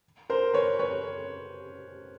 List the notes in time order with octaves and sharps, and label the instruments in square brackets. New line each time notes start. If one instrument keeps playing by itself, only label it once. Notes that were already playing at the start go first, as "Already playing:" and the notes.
[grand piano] A#4 C5
B4 C#5
B4 C#5